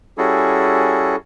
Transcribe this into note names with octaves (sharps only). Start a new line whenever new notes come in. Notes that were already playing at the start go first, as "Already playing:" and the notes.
G3 C#4 E4 F#4 G#4 A4